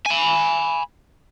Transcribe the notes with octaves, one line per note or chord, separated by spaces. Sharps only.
G#5 B5